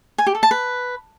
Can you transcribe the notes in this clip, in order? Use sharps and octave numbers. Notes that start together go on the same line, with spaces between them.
G#5
G4
A4
A5
B4